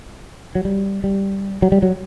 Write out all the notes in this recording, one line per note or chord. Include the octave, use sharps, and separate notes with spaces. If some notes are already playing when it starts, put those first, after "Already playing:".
F#3
G3
G3
F#3
G3
F#3